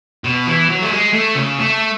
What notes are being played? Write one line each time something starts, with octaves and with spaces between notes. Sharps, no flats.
B2
E3
F#3
A3
G#3
A3
C#3
A3